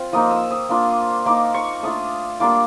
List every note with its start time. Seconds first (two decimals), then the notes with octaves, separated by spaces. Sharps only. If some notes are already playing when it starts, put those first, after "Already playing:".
Already playing: C4 F4
0.12 F3 A#3 D#4 D#6
0.31 E6
0.51 D#6
0.69 A#3 D4 F4
1.26 A#3 D#4 D6
1.54 C#6
1.83 A3 D4 F4 D#6
2.40 G3 A#3 D4 F4 D6